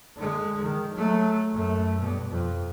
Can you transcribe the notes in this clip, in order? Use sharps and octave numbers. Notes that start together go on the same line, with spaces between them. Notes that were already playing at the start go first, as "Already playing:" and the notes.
D3 G#3
D#3
F#3 A3
F#2 A3
G2 B2
F2